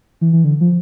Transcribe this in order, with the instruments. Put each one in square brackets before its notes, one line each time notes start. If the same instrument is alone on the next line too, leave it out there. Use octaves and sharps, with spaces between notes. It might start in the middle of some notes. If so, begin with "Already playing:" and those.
[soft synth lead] E3
E3
D3
F3